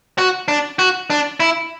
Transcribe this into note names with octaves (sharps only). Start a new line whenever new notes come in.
F#4
D4
F#4
D4
E4